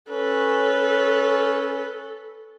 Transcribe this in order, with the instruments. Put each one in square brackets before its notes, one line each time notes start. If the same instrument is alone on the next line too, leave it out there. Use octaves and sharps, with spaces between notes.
[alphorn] C#4 [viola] A4 [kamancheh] B4